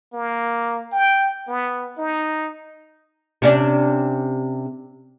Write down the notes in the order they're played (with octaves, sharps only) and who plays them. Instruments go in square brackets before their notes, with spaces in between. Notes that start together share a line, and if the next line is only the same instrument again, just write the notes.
[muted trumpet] A#3
G5
B3
D#4
[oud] C3 C#4 D4